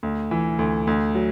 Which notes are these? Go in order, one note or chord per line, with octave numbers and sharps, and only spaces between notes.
D2
E3
D2
D2
F#3